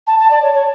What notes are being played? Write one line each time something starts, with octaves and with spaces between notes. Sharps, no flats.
A5
A5
D5
C#5
C#5